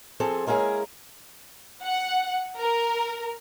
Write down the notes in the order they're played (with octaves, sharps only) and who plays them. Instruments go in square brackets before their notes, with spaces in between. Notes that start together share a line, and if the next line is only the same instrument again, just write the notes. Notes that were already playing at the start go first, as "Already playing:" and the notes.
[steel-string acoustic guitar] F3 C4 G#4 A4
G#3 A#3 C#4 E4 G#4 A#4
[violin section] F#5
A#4